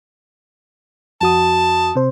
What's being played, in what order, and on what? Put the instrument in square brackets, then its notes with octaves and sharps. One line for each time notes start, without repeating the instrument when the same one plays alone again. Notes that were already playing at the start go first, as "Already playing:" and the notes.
[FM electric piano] F2 F#4 D#6 [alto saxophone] A5
[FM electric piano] C3 C5